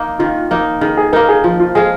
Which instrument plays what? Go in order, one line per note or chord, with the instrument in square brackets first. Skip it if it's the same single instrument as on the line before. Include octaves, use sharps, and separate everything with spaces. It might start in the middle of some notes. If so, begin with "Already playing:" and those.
Already playing: [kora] A#3 D#4
[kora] D#3 [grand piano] F4
[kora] A#3 D#4
[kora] D#3 [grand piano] G#4
[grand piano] G#4
[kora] A#3 D#4 [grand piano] A#4
[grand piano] G#4
[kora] F3 [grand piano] F4
[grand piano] F4
[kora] G#3 F4 [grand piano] G#4